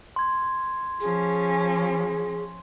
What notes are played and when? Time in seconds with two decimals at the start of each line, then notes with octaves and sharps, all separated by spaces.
0.16 C6 G#6
1.01 F3 C#4 G#4